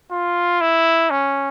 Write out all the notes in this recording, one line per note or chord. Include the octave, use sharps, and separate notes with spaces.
F4
E4
C#4